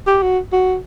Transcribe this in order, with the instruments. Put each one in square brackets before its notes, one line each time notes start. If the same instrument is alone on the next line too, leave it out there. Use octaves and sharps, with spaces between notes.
[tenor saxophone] G4
F#4
F#4